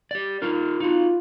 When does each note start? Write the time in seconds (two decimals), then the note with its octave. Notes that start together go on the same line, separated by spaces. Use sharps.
0.11 G4 D5
0.42 D#4 F4 A#4
0.80 D#4 F4 F#4